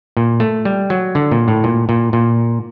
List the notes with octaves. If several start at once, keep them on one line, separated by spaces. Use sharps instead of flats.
A#2
A3
G3
F#3
D3
A#2
A2
A#2
A#2
A#2